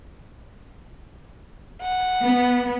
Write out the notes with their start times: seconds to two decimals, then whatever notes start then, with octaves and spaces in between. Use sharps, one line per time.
1.82 F#5
2.22 B3